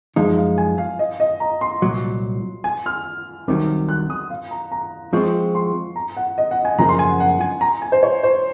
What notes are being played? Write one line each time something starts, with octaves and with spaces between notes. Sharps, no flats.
F#2 F3 G#3 D#4 F5
F5
G#5
F5
D#5
D#5
A#5
C6
C2 A#2 F#3
G#5
F6
C2 C3 D#3 F#3
F#6
D#6
F5
A#5
A#5
F3 G#3 C4 F4 C#6
C6
A#5
F#5
D#5
F#5
G#5
F#2 C#3 F3 A#3 A#5
C6
G#5
F#5
F#5
G#5
A#5
G#5
C5
C#5
C5